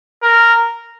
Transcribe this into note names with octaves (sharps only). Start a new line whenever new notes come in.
A#4